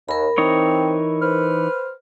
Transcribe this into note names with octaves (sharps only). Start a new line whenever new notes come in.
D#2 A#4 B5
E3 C4 D#4 C#5
B4 C5 F6